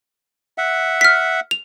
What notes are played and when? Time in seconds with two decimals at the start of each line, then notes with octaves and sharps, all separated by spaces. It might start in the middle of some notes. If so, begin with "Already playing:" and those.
0.58 E5 F#5
1.01 F6 B6
1.51 F7